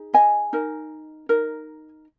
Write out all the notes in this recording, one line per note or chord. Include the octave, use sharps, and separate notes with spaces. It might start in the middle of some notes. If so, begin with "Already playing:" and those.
Already playing: D#4 G#4
D#5 G#5
D#4 A#4
D#4 A#4